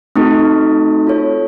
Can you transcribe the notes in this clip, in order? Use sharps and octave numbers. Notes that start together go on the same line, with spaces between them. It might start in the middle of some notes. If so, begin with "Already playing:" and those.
A3 C4 D#4 F#4 A4
F4 A4 C#5